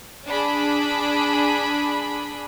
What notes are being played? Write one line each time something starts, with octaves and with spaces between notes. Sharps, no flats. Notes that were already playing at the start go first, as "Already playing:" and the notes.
D4 G#4 B5